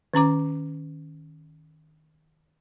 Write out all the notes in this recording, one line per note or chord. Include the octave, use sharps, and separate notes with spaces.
D#3 C#4 A#5 D6